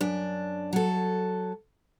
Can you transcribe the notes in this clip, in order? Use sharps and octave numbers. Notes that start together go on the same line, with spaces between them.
F#2 D4
F#3 A4